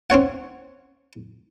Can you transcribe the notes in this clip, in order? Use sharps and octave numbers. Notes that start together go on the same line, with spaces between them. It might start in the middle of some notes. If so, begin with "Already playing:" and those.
C4 C#4 C#5 F#5